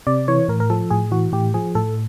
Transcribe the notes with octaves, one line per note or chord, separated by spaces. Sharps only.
C3 D5
E3 C#5
A2 A#4
A#4
F3 A4
A2 G#4
E3 F#4
A2 G4
F3 G#4
A2 A4